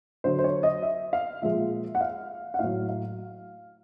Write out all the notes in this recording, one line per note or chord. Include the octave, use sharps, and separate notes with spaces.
D3 F#3 C5
C5
C#5
D#5
E5
F5
A#2 F3 G#3 E5
F#5
F5
F#5
A2 F#3 F5
F5